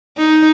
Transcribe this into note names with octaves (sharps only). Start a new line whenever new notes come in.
D#4